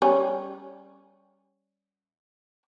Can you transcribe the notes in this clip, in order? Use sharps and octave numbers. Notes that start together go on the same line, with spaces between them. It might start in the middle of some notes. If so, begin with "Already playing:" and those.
G3 C#4